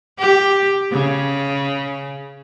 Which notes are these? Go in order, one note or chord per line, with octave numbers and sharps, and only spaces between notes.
G4
C#3